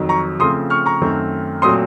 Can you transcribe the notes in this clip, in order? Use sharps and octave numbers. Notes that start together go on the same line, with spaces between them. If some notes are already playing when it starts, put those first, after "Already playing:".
Already playing: F2 D#3 F#3
A#5 C#6
C#3 F3 A3 C4 C6 D#6
C#6 F6
A#5 C#6
F#2 D#3 A3 C4
A#2 F#3 A3 C4 C6 D#6